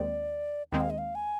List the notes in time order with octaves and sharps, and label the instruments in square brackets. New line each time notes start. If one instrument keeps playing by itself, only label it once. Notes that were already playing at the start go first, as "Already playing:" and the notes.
Already playing: [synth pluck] D#2 D#3 G#3 C4 [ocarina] D5
[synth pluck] D#2 D#3 G#3 C4 [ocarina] G5
[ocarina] F5
D#5
F5
G#5